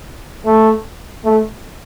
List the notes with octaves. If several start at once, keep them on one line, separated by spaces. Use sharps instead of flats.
A3
A3